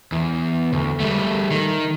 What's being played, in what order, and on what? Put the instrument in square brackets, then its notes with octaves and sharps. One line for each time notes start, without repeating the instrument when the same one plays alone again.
[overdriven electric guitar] E2
D2
G3 A3
D#3